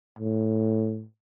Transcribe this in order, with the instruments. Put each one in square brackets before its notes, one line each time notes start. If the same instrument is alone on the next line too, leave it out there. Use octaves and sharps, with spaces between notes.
[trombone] A2